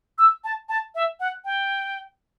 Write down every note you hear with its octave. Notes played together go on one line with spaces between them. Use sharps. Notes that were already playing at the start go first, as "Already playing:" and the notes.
E6
A5
A5
E5
F#5
G5